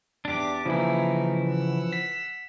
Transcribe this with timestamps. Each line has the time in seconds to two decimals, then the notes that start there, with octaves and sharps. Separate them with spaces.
0.25 E2 D4 G4 D6
0.66 C#3 E3 F3 A#3 D#4 E4
1.49 F#5 E6
1.93 B6